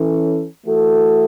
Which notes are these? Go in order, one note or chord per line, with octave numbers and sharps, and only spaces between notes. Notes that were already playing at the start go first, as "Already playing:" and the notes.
Already playing: E3 C#4 A4
E3 A3 F#4 A4